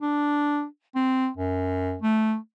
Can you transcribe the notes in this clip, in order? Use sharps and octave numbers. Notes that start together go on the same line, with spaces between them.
D4
C4
F#2
A3